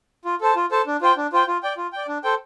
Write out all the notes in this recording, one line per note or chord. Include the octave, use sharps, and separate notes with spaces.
F4
A4 C5 A5
F4
A4 C5 A5
D4
F4 C5 G5
D4
F4 C5 G5
F4
D5 G5
F4
D5 G5
D4
A4 C5 G5